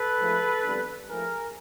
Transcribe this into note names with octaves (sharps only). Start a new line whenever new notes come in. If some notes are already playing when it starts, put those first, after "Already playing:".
Already playing: A4 B4
G#2 F3 A3
F2 D3 G3 B3
G#2 F3 A3 G#4 A#4